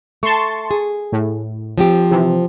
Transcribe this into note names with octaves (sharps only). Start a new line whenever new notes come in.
A3 A5 C6 C#6
G#4
A2
F3 C4 G4
C3 E3